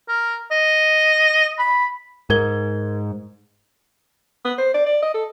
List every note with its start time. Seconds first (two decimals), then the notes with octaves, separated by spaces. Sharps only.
0.08 A#4
0.51 D#5
1.59 B5
2.30 G#2 A#4 G#6 G7
4.45 B3
4.58 C5
4.74 D5
4.86 D5
5.03 D#5
5.14 A4